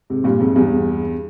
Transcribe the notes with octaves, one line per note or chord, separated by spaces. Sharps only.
G#2 C3
G2 A#2
F2 G#2
E2 G2